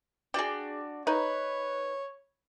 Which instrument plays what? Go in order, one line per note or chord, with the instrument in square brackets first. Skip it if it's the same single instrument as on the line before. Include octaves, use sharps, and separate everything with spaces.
[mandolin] D4 F#4 D5 [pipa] G#4 G5
[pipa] D#4 [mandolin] B4 [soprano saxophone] C#5